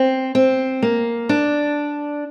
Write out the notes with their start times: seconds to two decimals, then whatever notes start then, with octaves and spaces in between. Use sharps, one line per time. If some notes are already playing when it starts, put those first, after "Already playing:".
Already playing: C4
0.35 C4
0.82 A#3
1.29 D4